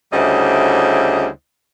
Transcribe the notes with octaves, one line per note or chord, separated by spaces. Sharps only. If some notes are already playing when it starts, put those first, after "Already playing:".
D2 C#3 G3 E4 C5 D#5